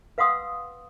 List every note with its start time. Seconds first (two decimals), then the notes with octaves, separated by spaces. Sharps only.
0.18 B4 F5 F#5 C6 D#6 E6